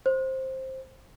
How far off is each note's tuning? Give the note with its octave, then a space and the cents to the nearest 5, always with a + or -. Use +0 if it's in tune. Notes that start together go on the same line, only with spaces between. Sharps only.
C5 +10